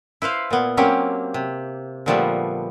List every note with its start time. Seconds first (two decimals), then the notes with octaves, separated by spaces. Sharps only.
0.22 E4 B4 C5 F5
0.50 A#2 B3
0.77 F#3 A#3 C4 C#4 G4
1.34 C3
2.06 A#2 D3 F3 G3 A3 B3